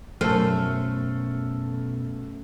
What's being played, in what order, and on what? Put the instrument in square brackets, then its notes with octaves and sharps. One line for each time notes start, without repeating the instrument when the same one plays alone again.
[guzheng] F#2 C5 [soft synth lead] B2 [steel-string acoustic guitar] A3 [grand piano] A4 F6